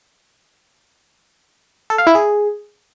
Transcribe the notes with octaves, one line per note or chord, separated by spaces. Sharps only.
A4
F5
E4
G#4